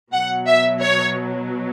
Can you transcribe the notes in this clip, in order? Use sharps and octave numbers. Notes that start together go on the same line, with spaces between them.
B2 F#3 F#5
E5
C#5